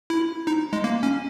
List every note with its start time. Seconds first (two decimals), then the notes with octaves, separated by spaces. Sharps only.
0.10 E4
0.47 D#4
0.73 G#3
0.84 A#3
1.03 C#4